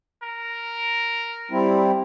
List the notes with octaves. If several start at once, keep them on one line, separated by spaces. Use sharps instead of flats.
A#4
G3 C4 E4